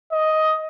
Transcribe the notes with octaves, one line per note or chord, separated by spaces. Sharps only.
D#5